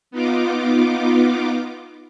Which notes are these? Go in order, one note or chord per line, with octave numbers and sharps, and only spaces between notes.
B3 D#4 F4 D6